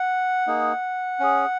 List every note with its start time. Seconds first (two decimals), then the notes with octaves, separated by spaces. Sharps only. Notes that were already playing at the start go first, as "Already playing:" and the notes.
Already playing: F#5
0.47 A#3 D#4 G#4
1.19 C#4 G#4